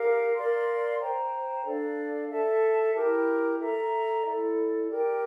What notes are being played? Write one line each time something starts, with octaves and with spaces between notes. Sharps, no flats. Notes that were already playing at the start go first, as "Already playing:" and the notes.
Already playing: G4 A#4 F5
A#4 D5 F5 C6
C5 G5 A#5
D4 A4 D5 F5
A4 E5 A5
E4 G4 A#4
A4 E5 A#5
E4 A4 D5
G4 A#4 D5 G5